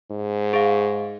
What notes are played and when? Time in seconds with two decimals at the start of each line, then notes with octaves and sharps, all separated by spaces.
0.12 G#2
0.53 G#4 F5